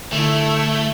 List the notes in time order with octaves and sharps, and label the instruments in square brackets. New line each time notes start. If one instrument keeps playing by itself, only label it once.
[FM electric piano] D3 D4 [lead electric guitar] A3 [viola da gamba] E4